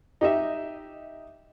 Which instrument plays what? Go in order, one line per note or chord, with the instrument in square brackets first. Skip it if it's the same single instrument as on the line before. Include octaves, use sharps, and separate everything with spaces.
[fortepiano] D#4 G4 D#5 E5